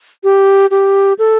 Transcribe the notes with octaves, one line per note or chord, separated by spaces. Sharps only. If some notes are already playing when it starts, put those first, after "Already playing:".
G4
G4
A4